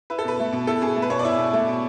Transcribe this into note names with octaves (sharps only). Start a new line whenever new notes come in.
E4 B4
A4
B2 B4
A3
B2
E4 A4
B2 G#4
A3
B4
B2 C#5
D5
E4 E5
B2
A3
B2